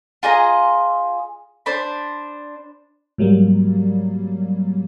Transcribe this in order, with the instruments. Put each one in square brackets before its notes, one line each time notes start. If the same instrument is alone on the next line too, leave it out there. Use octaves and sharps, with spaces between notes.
[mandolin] F4 G#4 D#5 A#5
D4 C5 B5
[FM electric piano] G#2 F#3 G3 A#3